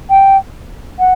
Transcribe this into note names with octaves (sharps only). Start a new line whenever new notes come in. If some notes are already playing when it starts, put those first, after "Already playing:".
G5
F#5